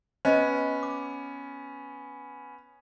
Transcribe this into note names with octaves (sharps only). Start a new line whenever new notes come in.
B3 C#4 C5 D#5
D6